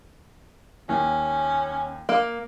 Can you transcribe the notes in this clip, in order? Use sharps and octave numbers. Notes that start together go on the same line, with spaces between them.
D#2 C#4
A#3